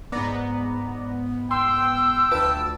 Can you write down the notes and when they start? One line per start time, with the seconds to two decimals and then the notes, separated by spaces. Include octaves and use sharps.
0.12 G#2 B3 D5 A#5
1.51 G5 C6 E6
2.31 D2 F4 B4 A5 D7